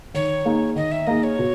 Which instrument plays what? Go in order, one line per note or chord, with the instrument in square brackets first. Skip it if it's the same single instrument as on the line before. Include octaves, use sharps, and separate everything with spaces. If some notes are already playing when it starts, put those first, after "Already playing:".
[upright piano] D#3 [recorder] C#5
[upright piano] A#3 D#4 G#4
[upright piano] D#3 [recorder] D#5
[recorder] E5
[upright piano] A#3 D#4 G#4 [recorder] D#5
[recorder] C#5
[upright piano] B2